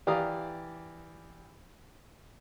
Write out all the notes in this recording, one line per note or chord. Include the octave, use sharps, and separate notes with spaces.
E3 G4 D5 F5 A#5 D#6